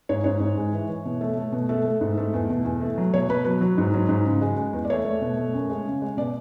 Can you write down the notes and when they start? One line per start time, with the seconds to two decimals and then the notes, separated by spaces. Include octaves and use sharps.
0.09 G#2 C#5
0.24 G#2 C#5
0.40 G#2
0.57 G#3
0.73 E3
0.88 E3
1.05 B2
1.21 A3
1.37 A3
1.52 B2
1.69 A3 A4
1.85 A3
2.01 G#2
2.17 A3
2.34 E2
2.50 B2
2.65 E2
2.81 A3
2.98 F#3
3.14 B2 C#5
3.29 B2 B4
3.45 F#3 B4
3.61 F#3
3.78 G#2
3.94 F#3
4.09 G#2
4.25 C#3
4.42 G#3
4.57 G#3
4.73 E2
4.85 D5
4.90 A3 C#5
5.05 A3
5.21 B2
5.37 A3
5.53 F#2
5.70 G#3
5.86 C#3
6.02 G#3
6.17 B2 D5